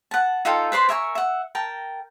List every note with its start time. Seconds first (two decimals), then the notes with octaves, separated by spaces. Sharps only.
0.11 F#5 A5
0.45 D#4 F4 A4 G5
0.72 B4 C5 D5 C6
0.89 A#4 E5 G#5 C#6
1.15 E5 F#5
1.55 A#4 G5 A5